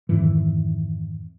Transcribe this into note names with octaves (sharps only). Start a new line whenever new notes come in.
F2 G#2 D#3 E3